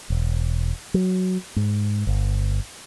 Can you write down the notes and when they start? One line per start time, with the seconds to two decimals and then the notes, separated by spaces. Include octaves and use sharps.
0.10 E1
0.94 F#3
1.56 G#2
2.07 G1